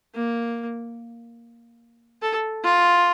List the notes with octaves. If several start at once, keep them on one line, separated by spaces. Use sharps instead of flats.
A#3
A4
F4